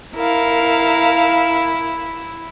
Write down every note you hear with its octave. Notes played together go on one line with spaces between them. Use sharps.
E4 A#4 F5